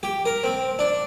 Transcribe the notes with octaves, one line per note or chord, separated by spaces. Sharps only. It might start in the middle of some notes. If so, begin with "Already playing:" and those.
G4
A#4
C4
D4